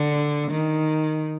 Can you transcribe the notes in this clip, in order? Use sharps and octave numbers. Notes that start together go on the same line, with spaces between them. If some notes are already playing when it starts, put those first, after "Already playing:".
Already playing: D3
D#3